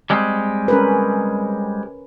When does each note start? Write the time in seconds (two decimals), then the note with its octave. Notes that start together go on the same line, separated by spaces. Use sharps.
0.10 G3 G#3 C4
0.68 C#4 A#4 B4